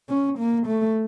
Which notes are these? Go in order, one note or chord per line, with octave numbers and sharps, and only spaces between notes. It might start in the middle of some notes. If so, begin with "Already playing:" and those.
C#4
A#3
A3